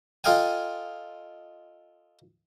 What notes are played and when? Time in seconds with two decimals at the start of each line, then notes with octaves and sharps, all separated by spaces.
0.24 F4 A4 D#5 F5 G5 G#5